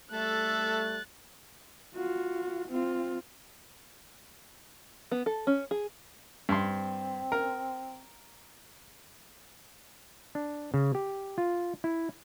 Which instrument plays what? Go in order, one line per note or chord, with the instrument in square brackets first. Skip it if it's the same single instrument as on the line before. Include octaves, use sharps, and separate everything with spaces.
[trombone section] G3 A3 [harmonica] A4 E5 [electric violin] F#6 A6
[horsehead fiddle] F4 F#4
C4 F4
[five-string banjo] B3
A4
C#4
G#4
[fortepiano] G2 C6 [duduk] C4
[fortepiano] A#4
[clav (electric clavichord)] D4
C#3
G4
F4
E4